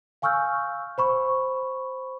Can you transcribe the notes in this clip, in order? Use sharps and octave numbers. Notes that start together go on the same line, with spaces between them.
F5 G#5 C#6 E6 F6 G6
C5 B5 C#6